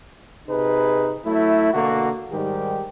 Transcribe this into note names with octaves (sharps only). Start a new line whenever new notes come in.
C3 D#4 G#4 B4
F#3 A3 E4
B2 D3 A#3 F#4
G#2 D#3 G3 G4